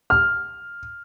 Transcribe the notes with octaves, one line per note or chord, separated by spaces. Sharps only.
F6